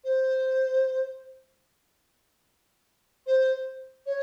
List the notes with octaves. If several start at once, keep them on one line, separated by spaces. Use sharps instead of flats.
C5
C5
C#5